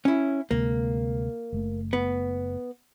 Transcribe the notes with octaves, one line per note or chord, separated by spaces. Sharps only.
C#4 E4
D2 C3 G#3 A#3
F#1 A3
B3